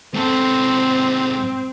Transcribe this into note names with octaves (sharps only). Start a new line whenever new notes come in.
G#2 C4 A4